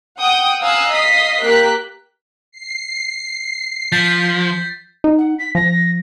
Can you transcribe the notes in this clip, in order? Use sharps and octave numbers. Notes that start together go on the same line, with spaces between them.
F#5 G5 D#6
F5 G#5 A#5 D#6 E6 F#6
D#5 F5 D#6 B6 C7
A#3 G4 A#4 F#6 B6
C7
F3 G6 A6 B6
D#4
F#5
B6
F3 A#6